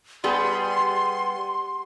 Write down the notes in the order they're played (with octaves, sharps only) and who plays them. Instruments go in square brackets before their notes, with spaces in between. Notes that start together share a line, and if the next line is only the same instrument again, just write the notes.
[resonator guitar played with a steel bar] G3 B3 G#4 [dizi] C6